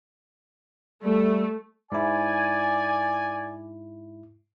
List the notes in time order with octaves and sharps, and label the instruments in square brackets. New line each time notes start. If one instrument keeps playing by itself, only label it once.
[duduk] G3 [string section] A3
[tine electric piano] G#2 E4 [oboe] D5 [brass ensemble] G#5